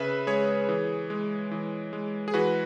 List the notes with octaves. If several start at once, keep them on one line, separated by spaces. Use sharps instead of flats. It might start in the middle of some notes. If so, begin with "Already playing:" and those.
Already playing: C#3 B4 E5
G#3 G#4 C#5
E3
G#3
E3
G#3
G#4
E3 F#4 B4